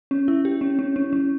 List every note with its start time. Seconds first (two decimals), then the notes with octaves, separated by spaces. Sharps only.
0.11 C#4
0.28 E4
0.45 G4
0.61 C#4
0.79 C#4
0.96 C#4
1.13 C#4